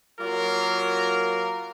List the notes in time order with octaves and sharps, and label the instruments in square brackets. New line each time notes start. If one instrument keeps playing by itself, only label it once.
[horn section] F#3 A#3 F4 A#4